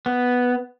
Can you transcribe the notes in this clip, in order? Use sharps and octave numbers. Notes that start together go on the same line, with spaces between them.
B3